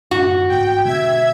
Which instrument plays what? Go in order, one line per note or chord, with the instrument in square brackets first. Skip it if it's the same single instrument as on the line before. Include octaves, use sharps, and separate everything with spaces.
[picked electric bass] F#2 A2 D3 [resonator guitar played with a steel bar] F#4
[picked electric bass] A#1 G#2 [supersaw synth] G5
[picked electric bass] B2 D3 G#3 [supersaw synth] E5 G#6